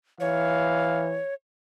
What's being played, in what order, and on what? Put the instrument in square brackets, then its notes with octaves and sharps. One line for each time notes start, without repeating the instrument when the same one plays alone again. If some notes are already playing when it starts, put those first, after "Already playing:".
[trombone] E3 [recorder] C#5 [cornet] F5